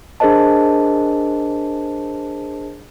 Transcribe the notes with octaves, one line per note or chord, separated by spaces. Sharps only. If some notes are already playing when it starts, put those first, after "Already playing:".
D4 G#4 A#4 C5 D#5 A5